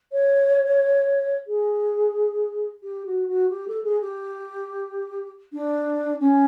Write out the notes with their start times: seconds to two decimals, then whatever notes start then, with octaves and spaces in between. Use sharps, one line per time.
0.12 C#5
1.47 G#4
2.82 G4
3.05 F#4
3.27 F#4
3.49 G4
3.67 A4
3.83 G#4
4.01 G4
5.52 D4
6.20 C#4